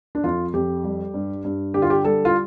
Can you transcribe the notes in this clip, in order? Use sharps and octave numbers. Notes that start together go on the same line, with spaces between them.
D4
F2 F4
F2 G4
G3
G2
G2
D3 G4
F4
G4
G3 A4
F4